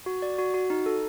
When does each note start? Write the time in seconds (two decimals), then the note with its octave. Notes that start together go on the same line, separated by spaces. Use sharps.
0.06 F#4
0.22 D5
0.38 F#4
0.54 F#4
0.70 D#4
0.86 A4